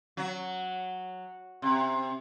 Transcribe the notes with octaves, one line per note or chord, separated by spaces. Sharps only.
F#3
C3